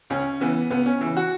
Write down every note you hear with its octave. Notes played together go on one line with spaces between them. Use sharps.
C#2 C#4
C#3 E3 B3
C#2 B3
C#4
C#3 E3
F#4